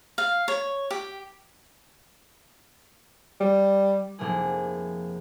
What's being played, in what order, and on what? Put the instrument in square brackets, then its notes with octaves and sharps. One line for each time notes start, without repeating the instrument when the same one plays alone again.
[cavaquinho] F5
C#5
G4
[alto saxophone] G3
[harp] F1 A#3 G#4